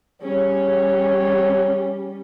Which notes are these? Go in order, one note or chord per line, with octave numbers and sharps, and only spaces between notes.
G3 C#4 G#4 C#5